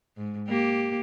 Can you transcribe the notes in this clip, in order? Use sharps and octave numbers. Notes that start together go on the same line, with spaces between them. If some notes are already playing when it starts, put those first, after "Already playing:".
G#2
A#3 G4